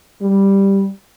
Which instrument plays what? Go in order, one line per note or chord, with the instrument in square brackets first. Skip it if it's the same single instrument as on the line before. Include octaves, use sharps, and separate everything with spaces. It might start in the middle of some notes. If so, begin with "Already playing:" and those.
[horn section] G3